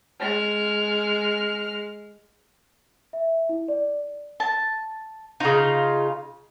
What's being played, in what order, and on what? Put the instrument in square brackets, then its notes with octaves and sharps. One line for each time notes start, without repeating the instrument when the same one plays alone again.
[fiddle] G#3 F6
[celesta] E5
E4
D5
[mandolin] A5
[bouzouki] C#3 F4 [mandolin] D#4